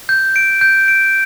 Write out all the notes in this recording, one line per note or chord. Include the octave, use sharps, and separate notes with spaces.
G6
D7
G6
D7